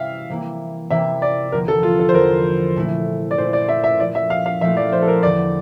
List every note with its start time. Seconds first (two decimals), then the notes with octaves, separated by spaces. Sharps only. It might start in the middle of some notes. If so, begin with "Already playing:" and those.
Already playing: C3 E3 G3 E5 F5
0.30 C3 E3 A#3 E4
0.90 C3 E3 A#3 E4 E5
1.22 D5
1.52 E2 D3 F3 A#3 A#4
1.68 A4
1.83 F4
1.99 A4
2.09 C5
2.14 E2 D3 F3 A#3 A#4
2.76 A#2 A3 E4
3.31 D5
3.38 A#2 A3 E4 C5
3.53 D5
3.69 E5
3.84 E5
3.98 A#2 F3 A3 E4 D5
4.15 E5
4.30 F5
4.46 F5
4.61 A#2 F3 A3 E4 E5
4.77 D5
4.92 C5
5.02 A4
5.08 A#4
5.23 E2 D3 A3 D5